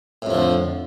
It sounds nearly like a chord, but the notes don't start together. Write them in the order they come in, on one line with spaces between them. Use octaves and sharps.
A2 F2 F3 D3